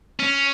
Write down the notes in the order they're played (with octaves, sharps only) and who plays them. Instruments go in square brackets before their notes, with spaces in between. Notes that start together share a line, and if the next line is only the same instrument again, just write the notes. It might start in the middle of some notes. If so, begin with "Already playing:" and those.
[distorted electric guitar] C#4